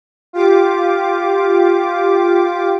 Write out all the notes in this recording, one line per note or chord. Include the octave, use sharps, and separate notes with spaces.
F4 G4 D6